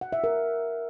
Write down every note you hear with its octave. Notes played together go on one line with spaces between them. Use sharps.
F#5
E5
A#4